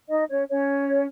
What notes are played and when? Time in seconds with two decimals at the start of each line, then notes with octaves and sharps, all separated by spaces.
0.09 D#4 D#5
0.29 C#4 C#5
0.50 C#4 C#5